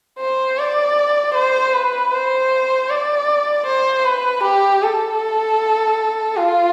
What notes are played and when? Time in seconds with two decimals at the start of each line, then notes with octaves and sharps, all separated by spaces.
0.19 C5
0.58 D5
1.35 C5
1.74 B4
2.12 C5
2.90 D5
3.67 C5
4.04 B4
4.44 G4
4.83 A4
6.37 F4